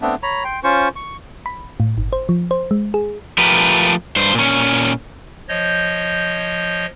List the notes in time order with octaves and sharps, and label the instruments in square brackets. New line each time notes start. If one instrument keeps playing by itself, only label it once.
[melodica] A3 B3 C4 D4
C#5 A#5 B5
G5 C6
C#4 F4 C5 C#6
C#6
[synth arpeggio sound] B5
A2
G1
C5
F3
C5
G#3
G#4
[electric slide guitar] F3 A3 G4 A#4 B4
G2 C5
A#2 C#4
[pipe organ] F3 C#5 D#5 G6